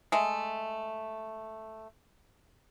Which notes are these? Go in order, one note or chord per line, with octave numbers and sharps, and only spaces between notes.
G#3 A3